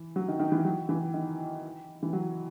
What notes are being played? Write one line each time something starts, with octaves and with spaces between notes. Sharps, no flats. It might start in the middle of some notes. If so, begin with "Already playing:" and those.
Already playing: E3
F#3
D#3
D#3
E3
F#3
E3
D#3
E3
F#3